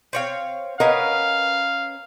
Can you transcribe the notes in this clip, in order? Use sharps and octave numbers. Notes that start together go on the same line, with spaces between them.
C4 C#5 F5
C#4 A#4 B4 D#5 F5 F#5